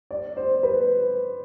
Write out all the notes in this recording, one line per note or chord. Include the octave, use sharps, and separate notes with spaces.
D5
C5
B4